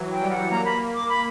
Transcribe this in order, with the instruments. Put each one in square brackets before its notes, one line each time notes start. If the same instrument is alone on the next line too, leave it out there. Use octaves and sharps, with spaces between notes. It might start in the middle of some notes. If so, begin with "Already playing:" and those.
Already playing: [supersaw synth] E3 F#3
[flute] G5
[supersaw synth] G3
[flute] F#5
[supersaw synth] A#3 [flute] A#5
[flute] B5
D6
B5